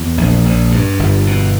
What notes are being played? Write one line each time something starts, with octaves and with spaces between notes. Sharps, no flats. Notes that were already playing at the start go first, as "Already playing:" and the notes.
Already playing: E2
A#1
A#1
G2
G1
B2